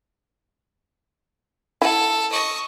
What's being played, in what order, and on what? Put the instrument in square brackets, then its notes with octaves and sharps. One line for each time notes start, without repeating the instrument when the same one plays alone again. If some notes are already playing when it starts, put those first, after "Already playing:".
[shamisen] E4 F#5 [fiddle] A4
[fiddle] D#5 C#6